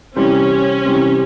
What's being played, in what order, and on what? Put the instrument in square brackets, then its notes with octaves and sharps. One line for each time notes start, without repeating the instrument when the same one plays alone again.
[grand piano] C3 E3 G3 C4 G4 [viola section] C#4
[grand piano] C3 E3 G3 C4 G4